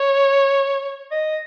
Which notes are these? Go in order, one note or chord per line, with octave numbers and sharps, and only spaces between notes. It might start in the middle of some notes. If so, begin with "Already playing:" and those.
Already playing: C#5
D#5